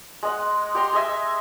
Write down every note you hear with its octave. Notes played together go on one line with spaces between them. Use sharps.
G#3 D#5 F#5
G4 F#5 A#5 C6
G#4 D#5 E5 G#5